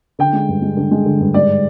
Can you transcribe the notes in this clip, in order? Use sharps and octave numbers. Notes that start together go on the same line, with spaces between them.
D3 G5
G#3
G2
G#3
D3
G#3
D3
G2
G#2 D5